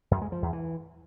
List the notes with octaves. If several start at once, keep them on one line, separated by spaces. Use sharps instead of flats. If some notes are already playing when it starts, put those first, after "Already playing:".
F#2
G#3
F3
E2
E3